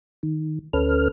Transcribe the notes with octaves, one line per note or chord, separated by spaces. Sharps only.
D#3
D2 C#4 A4 B4 F6